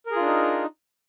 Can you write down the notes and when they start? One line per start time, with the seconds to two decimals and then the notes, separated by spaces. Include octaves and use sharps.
0.06 A#4
0.11 G#4
0.16 F4
0.21 D4
0.26 D#4